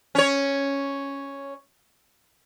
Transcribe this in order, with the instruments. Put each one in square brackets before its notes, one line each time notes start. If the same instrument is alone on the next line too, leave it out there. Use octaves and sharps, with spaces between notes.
[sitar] C#4 C#5